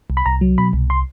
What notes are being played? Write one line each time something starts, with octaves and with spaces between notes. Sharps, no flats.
C2
B5
C2 A#5
F#3
B2 B5
C2
C6